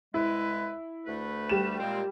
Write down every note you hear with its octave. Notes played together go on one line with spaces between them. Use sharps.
C2 G#3 E4 B4
D2 A3 B4
G3 E7
A#2 G#3 C4